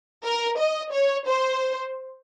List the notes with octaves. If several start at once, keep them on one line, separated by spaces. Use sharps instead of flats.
A#4
D#5
C#5
C5